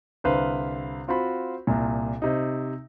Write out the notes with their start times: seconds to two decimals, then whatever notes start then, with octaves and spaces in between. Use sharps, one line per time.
0.24 C2 D3 B4 C5 F5
1.08 C4 F4 F#4 C5 B5
1.67 C2 A#2
2.22 C3 D#4